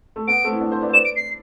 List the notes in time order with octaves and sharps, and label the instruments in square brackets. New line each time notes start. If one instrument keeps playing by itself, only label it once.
[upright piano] A3
[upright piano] B3 [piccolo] D7
[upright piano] A3 C4
E4
B3 D4
A4 C5
B4 D5
C5
[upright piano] B4 D5 [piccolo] E7
[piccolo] D7
C7